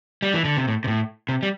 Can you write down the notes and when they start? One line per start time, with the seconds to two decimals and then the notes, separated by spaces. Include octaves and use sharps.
0.22 G3
0.34 E3
0.45 D3
0.57 C3
0.68 A2
0.84 C3
0.88 A2
1.29 C3
1.43 G3